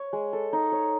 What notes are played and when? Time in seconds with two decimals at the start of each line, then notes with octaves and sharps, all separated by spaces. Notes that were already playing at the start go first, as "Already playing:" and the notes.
Already playing: C#5
0.13 G#3
0.33 A4
0.53 D#4
0.72 C#5